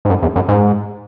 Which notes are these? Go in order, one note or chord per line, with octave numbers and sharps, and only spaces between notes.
G#2
F#2
E2
F#2
G#2